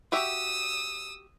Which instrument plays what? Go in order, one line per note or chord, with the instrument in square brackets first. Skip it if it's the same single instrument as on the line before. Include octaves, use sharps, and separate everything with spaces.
[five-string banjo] F#4 G4 E5 [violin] D#6 E6